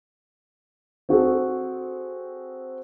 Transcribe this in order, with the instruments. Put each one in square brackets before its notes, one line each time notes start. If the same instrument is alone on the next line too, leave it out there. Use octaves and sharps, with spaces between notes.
[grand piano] C4 F#4 G#4 A4